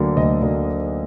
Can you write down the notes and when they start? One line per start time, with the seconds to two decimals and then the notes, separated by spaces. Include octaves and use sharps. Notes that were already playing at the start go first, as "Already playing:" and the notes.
Already playing: D2 D3 F#3 A#3
0.17 D2 D#5
0.42 D3 F#3 A#3